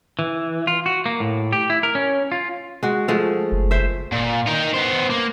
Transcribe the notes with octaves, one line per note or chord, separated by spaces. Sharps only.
E3
F4
F#4
A#3
A2
G4
E4
A#4
C#4
F4
G#3 F#4
F3 G#3 A3
F#1
C5 E5
A#2
D#4 A#4
B3 C5
A#3